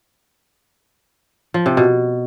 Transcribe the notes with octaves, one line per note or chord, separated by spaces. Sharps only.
F3
C3
B2